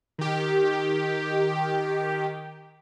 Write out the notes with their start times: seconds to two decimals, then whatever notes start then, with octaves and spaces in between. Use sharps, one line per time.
0.18 D#3 G4